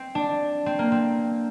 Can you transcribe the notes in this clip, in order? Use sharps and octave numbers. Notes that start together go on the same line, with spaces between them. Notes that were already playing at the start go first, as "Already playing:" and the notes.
Already playing: C4
D4
C4
A#3
C4